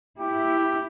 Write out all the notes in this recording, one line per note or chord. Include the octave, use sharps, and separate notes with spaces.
E4 G4